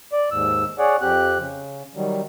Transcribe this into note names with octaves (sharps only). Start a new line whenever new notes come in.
D5
D#2 G#2 E6
G#4 C#5 D5 F#5
F2 C4 G4 F#6
C#3
D#3 F#3 G3